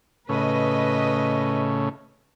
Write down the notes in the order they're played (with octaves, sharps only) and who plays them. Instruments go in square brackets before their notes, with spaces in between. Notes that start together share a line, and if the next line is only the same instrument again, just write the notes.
[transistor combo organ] A2 C#3 [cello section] B4 D#5